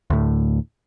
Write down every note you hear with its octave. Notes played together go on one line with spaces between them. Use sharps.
D2 A2